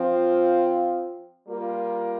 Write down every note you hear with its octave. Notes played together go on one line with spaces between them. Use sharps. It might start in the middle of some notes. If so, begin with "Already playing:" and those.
Already playing: F3 C4 F4
G3 A#3 F4 A#4